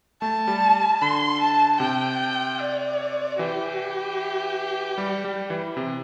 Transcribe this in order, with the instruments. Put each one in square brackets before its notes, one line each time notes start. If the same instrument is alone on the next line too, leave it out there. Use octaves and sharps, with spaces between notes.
[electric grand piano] A3 [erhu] A5
[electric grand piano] G3
[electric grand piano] D3 [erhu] C6
[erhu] A5
[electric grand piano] C3 [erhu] G5
[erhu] D5
[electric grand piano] E3 [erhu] G4
[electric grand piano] G3
G3
E3
C3